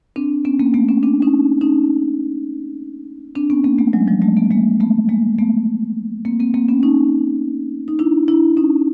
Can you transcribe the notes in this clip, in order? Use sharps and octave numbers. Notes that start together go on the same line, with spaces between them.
C4 D4
B3 C#4
A#3 C4
A3 B3
B3 C#4
C4 D4
C#4 D#4
C#4 D#4
C4 D4
B3 C#4
A#3 C4
A3 B3
F#3 G#3
F3 G3
G3 A3
A3 B3
G#3 A#3
A3 B3
G#3 A#3
A3 B3
A#3 C4
A#3 C4
A#3 C4
B3 C#4
C#4 D#4
D#4
D4 E4
D4 E4
C#4 D#4